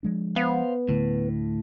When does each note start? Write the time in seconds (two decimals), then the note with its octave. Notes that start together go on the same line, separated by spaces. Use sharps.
0.03 F3 G#3 D4
0.36 B3 C5 F5
0.89 D2 A2 D3